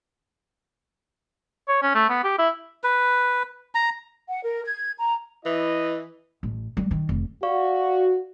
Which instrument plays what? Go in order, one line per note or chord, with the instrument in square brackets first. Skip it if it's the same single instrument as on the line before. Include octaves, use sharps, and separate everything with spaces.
[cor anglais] C#5
C#4
A3
B3
G4
E4
[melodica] B4
A#5
[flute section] F#5
A#4
G#6
A#5
[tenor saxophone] E3 [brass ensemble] E4 D#5
[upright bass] A1
G3
D#3
F1
[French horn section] F#4 [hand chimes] D5 F5 C#6